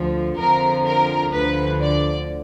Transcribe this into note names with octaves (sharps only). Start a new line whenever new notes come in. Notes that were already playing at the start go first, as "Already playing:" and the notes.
Already playing: D2 D3 F3
F2 D3 F3 A#4
A#4
D2 D3 F3 B4
D5